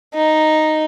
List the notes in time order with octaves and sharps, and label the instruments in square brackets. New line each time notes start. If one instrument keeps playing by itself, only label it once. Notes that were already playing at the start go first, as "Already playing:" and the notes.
[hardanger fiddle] D#4